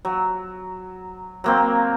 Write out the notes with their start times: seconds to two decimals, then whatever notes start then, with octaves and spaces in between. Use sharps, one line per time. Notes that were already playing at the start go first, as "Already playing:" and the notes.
0.05 F#3
1.44 F#3 A#3 C4